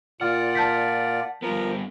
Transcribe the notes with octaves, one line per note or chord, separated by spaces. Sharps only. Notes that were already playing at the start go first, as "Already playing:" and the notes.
A#2 F4 D5 F#5 F6
A5 G6 B6
G2 F3 B3 A#4